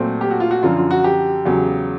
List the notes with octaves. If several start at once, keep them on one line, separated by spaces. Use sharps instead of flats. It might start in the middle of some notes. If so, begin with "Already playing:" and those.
Already playing: A#2 F#3 A3 C4
G4
F#4
F4
F#4
F#2 D3 F3 F4
F4
F#4
G4
E2 C#3 F#3